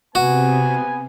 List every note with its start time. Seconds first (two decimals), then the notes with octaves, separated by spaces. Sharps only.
0.15 C3 B3 F#4 G#5